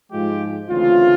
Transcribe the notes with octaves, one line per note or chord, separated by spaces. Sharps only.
G#2 F3 G#3 F4 G4
D2 C#3 E3 A3 C4 F4